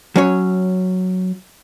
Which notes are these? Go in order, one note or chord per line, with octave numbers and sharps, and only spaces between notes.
F#3 C#4 C#5